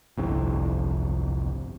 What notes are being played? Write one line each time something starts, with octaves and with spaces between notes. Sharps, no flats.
G1 C2 F2